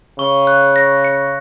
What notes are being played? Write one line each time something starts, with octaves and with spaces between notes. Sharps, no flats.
C#3 C#6
F#6
A#6
C#7